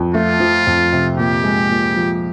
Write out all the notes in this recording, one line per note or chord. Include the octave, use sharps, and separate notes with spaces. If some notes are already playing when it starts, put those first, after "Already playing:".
Already playing: F2
A3 F4
F3
F2
C3
A#2 G4
G#3
A#2
F3